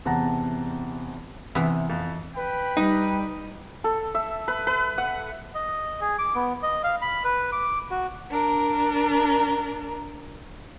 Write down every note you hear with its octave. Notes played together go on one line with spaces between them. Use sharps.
E2 C3 F#5 A5 A#5 A#6
C3 E3 B3
F2
B4 G5 B5
G3 D#4
A4
E5
B4
B4
F#5
D#5
G#4
D6
B3
D#5
F5
B5
B4
D6
F#4
D4 A#4